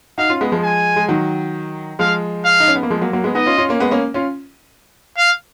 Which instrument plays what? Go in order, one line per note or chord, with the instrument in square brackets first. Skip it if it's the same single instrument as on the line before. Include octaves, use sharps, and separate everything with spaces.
[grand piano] D#4 F#4 [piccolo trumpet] F5
[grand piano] C#4 F4
G#3 B3
F3 G#3
[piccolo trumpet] G#5
[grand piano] G#3
D#3 F#3
[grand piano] F3 G#3 [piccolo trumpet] F5
[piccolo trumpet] F5
[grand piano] D#4
C#4
B3
A#3
F3 G#3
F#3 A#3
F#3 A#3
G#3 B3
[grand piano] B3 D#4 [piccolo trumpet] D#5
[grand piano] C#4 F4
C#4 F4
A#3 C#4
G#3 B3
A#3 C#4
C#4 F4
[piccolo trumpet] F5